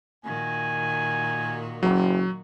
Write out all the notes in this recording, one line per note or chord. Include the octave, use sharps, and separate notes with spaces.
A#2 D#3 F#4 G#5
F#1 F#3